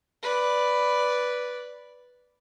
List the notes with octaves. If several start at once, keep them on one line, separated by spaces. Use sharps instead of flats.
B4 D5